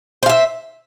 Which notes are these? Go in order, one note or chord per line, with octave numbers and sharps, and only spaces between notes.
C5 E5 F5